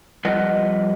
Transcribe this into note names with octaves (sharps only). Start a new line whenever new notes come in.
F2 G3 F4 B4 D#5 F#5